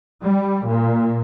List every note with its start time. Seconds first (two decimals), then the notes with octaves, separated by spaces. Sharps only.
0.25 G3
0.68 A#2